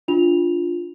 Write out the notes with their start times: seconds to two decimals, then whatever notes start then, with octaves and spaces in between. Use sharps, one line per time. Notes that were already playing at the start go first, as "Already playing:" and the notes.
0.08 D4 F4 F7